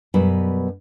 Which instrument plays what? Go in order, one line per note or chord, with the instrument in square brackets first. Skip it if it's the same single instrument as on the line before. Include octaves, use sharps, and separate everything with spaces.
[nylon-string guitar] F#2 B2 G3 B4